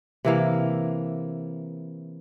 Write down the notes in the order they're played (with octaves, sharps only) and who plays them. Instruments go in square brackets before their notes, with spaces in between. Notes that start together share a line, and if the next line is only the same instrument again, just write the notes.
[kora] C3 E3 A#3